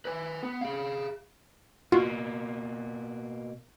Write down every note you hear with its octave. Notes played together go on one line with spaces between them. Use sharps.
B4 G#5
B3
G#4 F5
B2 A#3 F4 F#4